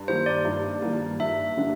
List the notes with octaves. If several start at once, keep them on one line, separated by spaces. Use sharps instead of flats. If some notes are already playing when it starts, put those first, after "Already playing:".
Already playing: G2
D#3 G3 A#3 C5
D5
G2
D#3 G3 A#3
G2 E5
D3 G3 A#3 D4